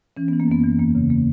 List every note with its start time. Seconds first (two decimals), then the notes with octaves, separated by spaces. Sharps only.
0.17 E3 C#4
0.28 E3 B3
0.40 A#3
0.48 F#2 B3
0.63 E3
0.79 E2 A#3
0.95 C#3
1.10 C#3 A#3